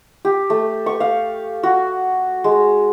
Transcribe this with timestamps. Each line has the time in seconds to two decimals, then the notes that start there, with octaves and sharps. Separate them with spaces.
0.25 G4
0.50 A3
0.86 C#6
1.00 F5
1.63 F#4
2.44 G#3